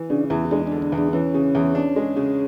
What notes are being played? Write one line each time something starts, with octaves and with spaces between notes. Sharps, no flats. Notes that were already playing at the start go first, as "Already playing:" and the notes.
Already playing: E3
C#3 D4
E2 E4
G#3 D4
D3 D4
D4
E2
D4
E3 C#4
C#3
E2
D4
G#3
C#3